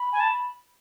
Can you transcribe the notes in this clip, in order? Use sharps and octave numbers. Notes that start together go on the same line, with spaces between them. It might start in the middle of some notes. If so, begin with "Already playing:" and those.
Already playing: B5
G#5
A5